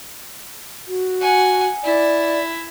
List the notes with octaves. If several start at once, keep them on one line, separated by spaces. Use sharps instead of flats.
F#4
F#5 G#5
E4 D5